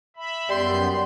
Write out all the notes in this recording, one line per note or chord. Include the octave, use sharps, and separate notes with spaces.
E5 B5
F#2 G3 B3 C6 G6